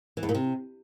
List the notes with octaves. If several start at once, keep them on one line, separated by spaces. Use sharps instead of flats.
E3
E2
A#2
C3